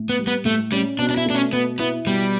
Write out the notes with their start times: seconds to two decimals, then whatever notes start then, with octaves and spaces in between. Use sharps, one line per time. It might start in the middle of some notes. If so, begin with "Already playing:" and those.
Already playing: A2
0.09 B3
0.19 G3
0.27 B3
0.45 A2 A3
0.72 G3 C#4
0.99 B2 D4
1.10 D4
1.17 E4
1.26 A3 D4
1.35 C#4
1.52 B2 B3
1.79 B3 E4
2.06 B2 G3